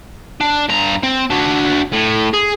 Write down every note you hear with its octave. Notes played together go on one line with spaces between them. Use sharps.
D4
G2 A#5
C4
D4 F#4
A2
G#4